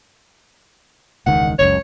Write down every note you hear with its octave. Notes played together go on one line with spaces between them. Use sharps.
E1 C#2 D#3 F#5
F#1 C#2 F#2 C#5